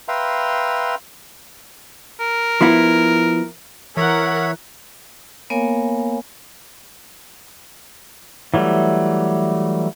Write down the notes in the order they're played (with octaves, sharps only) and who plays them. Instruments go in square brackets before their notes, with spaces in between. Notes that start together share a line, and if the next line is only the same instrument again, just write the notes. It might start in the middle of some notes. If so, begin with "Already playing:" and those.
[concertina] B4 E5 F5 G5 A#5 C6
[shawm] A#4
[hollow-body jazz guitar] F3 B3 E4
[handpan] E3 [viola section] A#4 F#5 [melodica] C#5 E5
[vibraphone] A#3 B3 A#4 C#5 F5 G#5
[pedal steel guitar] E3 F#3 G3 A3